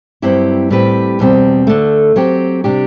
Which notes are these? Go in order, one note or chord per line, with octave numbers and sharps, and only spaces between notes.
G2 F#3 C4 E4 G4
A2 G3 C4 G4 B4
E2 B2 G3 C4
D2 D3 A3
F#3 C4 G4
C3 G3 D4 G4